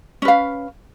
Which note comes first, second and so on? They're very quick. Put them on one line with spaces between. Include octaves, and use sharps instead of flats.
C#4 B4 F5